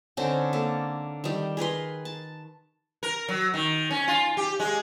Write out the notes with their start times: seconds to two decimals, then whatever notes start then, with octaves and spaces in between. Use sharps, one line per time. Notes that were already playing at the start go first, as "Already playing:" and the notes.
0.17 D3 C4 C#4 D#4
0.53 A#3 A4
1.24 D#3 G3
1.57 G#4 A#4 B4 C6
2.05 A5
3.03 A#4
3.28 F#3
3.54 D#3
3.91 C#4
4.08 F4
4.37 G4
4.60 G#3